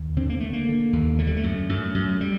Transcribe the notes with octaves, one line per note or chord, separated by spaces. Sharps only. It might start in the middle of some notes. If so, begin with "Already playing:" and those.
Already playing: D#2
D3 C4
A#3
D3 A3
A#3
D3
D#2
D3 A3
G3
A3
F#2
F#2
F#2
G3